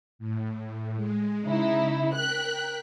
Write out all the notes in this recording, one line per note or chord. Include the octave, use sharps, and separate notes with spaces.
A2
G#3
C#3 D#4 E4
A#4 G5 F#6 B6